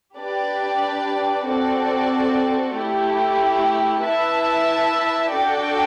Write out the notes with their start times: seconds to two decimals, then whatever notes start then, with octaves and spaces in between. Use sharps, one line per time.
0.17 D4 G4 B4 D5
1.46 C4 F#4 A4 D5
2.75 A3 E4 G4
4.03 E4 B4 E5 A5
5.31 D4 F#4 A4 D5 G5